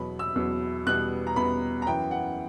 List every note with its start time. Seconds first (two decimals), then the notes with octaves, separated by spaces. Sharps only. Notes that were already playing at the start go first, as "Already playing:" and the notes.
Already playing: E2 B2 F#3 B5
0.19 E6
0.36 E2 B2 F#3
0.86 E2 B2 G3 B3 F#6
1.27 A#5
1.36 E2 B2 G3 B3 B5
1.82 A#5
1.86 F#2 E3 B3 G5
2.11 F#5